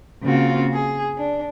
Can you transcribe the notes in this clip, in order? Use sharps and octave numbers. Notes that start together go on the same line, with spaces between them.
C#3 A#3 C4 F4 F#4
G#4
D4